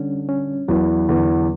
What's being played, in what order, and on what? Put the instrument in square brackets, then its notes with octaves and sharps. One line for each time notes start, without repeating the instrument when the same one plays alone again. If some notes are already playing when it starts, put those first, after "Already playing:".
Already playing: [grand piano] D3 [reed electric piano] G3 C#4
[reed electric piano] C#4
[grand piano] E2 E3 [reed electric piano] F#3
[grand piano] E2 E3 [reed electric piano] D3